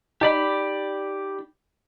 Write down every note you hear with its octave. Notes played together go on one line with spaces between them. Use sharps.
D#4 G4 D5 B5